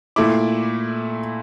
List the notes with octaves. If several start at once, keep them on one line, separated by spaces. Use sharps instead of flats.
A#2 A3 E4 D6